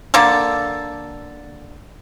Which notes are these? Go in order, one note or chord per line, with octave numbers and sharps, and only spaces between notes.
D3 A#3 A4